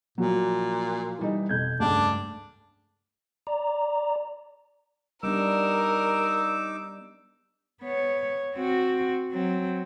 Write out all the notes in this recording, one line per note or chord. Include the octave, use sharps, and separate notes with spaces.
A#2 F3 F#3 F#4
E3 G3 D#4
F2 B2 G6 G#6
F1 C#2 G2 A3 D4
D5 A#5
G3 B3 D4 D#4 A#4 D6 E6
B3 C#5
C4 F#4
F#3 C4